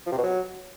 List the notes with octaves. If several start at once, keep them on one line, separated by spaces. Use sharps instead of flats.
F3
C3
B2
F#3